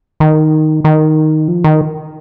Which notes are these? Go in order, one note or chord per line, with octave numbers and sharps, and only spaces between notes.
D#3
D#3
F3
D#3